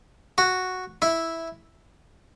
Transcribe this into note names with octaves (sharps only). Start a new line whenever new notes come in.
F#4
E4